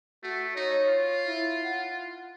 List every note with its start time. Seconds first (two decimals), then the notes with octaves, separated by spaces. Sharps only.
0.23 A3 F#4
0.56 D#4 C#5
0.89 F4
1.27 E4
1.64 F#5